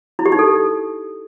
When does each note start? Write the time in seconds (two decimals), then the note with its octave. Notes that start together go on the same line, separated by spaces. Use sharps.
0.19 E4
0.26 G4
0.32 D#4
0.39 A4